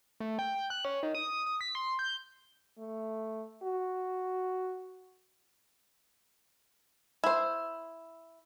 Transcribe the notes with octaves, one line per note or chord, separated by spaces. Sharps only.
A3
G5
F#6
C#4
D#3
D#6
D#6
B6
C6
G6
A3
F#4
E4 C5